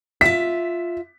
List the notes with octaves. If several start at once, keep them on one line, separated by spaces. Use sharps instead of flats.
F4 E5 B6